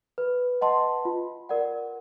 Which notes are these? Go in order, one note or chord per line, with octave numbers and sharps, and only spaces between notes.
B4
D#5 F#5 A5 C6
F4
A#4 D5 F#5